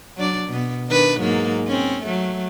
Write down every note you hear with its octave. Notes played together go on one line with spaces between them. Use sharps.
F#3 D4 D5
B2 B3
D#3 D4 B4
G#2 F#3 A#3
C4 C#4
F#3 A3